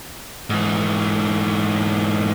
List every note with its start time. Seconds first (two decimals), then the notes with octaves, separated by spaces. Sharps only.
0.50 G#2 E3